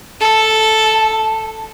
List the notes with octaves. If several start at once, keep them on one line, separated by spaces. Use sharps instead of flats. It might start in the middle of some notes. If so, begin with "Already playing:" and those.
A4 A5